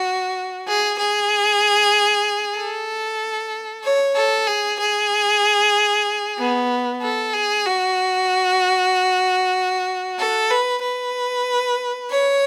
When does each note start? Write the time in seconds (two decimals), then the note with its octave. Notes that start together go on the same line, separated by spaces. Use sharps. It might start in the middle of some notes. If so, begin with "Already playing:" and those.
Already playing: F#4
0.68 G#4
0.99 G#4
2.57 A4
3.84 C#5
4.16 A4
4.48 G#4
4.80 G#4
6.38 B3
7.02 A4
7.33 G#4
7.66 F#4
10.19 A4
10.51 B4
10.83 B4
12.10 C#5